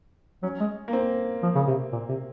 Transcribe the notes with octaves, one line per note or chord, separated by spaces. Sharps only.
F#3 C#4
G#3
A#3
C4
F3
C#3
C3
A#2
C3